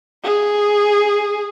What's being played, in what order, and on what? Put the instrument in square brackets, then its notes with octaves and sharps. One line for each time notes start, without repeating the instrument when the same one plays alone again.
[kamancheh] G#4